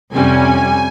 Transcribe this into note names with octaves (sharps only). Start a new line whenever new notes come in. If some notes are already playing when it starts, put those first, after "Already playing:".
F2 C3 G3 C#4 G#5